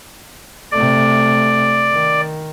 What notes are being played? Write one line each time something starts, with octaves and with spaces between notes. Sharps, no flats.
C3 A3 D5
D#3